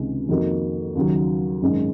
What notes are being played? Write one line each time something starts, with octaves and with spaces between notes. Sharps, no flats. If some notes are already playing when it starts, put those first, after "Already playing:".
Already playing: C#2 C3 D#3 G#3 C#4
F2 D#3 A#3 D#4 F#4
D#2 C#3 F#3
G#1 F#2 D#3 G#3 C#4